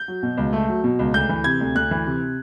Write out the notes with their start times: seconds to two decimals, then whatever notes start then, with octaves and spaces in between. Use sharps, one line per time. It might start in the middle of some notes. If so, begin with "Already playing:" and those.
Already playing: G6
0.08 F#3
0.23 B2
0.38 C#2
0.53 A3
0.69 F#3
0.84 B2
0.99 C#2
1.14 D2 G6
1.29 E3
1.44 C3 G#6
1.61 D2
1.76 D2 F#6
1.91 E3
2.06 C3